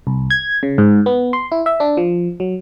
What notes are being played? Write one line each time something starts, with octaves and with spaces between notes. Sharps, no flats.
C2
G#6
C#3
G#2
B3
C6
E4
E5
D4
F3
F#3